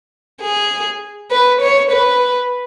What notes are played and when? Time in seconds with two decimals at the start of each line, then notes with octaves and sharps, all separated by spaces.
0.42 G#4
1.31 B4
1.61 C#5
1.91 B4